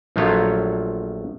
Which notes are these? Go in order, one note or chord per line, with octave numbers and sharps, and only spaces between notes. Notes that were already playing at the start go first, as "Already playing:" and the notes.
A#1 F3 F#3 A3 F4 C#5